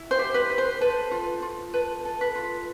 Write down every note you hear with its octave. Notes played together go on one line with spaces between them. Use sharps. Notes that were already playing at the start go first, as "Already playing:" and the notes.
Already playing: E4
C5
G4
B4
B4
C5
A4 B4
F4
F4
A4 B4
A4
B4
F4